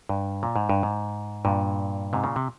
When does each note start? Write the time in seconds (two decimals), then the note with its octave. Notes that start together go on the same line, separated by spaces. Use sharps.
0.09 G2
0.43 A#2
0.56 G#2
0.69 G2
0.83 G#2
1.45 G2 A#2
2.13 G#2 C3
2.24 A#2 C#3
2.36 C3